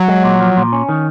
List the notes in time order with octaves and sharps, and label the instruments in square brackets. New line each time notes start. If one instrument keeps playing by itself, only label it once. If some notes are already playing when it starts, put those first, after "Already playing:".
Already playing: [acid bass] F#3
[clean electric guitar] G#3
A#2
F3
A#2
C#4
D#3